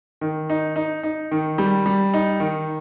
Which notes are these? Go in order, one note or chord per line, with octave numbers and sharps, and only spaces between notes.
D#3
D#4
D#4
D#4
D#3
G3
G3
D#4
D#3